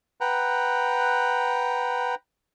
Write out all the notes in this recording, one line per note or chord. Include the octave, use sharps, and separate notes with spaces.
B4 F#5 G5 A#5